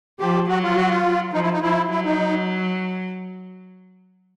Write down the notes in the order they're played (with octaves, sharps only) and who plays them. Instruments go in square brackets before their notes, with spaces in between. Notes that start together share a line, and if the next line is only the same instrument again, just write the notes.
[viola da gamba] F3 [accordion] G4
[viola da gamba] F#3 [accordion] F#4
[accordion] F4
F#4
F4
[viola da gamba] F#3
[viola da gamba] F3 [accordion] D#4
[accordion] E4
D#4
[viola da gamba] F3 [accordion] E4
[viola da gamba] F#3 [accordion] E4
[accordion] D#4